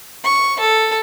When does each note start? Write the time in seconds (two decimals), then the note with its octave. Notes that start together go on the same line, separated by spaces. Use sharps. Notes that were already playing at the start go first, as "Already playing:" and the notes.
0.24 C#6
0.60 A4